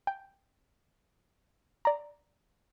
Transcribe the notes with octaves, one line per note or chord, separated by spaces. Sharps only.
G5
D5 A#5